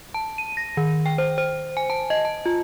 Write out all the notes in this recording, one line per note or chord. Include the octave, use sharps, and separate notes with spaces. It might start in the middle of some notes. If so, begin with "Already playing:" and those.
A5
D#7
A#6
D#3
G5
C5
C5
G#5
A5
D#5
A5
F4